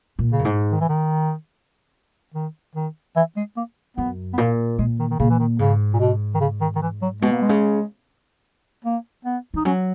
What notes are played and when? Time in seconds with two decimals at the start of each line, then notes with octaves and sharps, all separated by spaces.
0.19 A#2
0.32 C#3
0.39 F#2
0.45 G#2
0.72 D#3
0.80 E3
0.89 D#3
2.34 D#3
2.75 D#3
3.16 E3
3.37 G#3
3.57 A#3
3.97 F#2 B3
4.33 B3
4.38 A#2 A#3
4.79 A#2 G#3
4.99 D#3
5.10 D#3
5.19 A#2 C#3
5.30 E3
5.39 D#3
5.59 G#2 C#3
5.93 A#2
6.00 B2
6.35 D#3
6.40 C#3
6.61 D#3
6.76 D#3
6.82 E3
7.02 F#3
7.22 B2 G#3
7.31 A#3
7.41 G#3
7.49 C#3
8.85 A#3
9.25 B3
9.54 E3 D#4
9.65 F#3 C#4